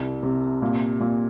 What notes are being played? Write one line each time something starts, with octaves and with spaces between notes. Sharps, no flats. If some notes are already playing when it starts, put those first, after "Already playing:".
Already playing: C2
C3
A#2
A#2